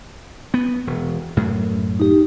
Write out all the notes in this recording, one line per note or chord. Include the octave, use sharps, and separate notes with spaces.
B3
E1
F#2 A2
D#4 G4